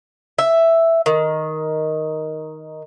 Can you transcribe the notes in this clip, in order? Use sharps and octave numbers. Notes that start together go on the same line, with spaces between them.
E5
D#3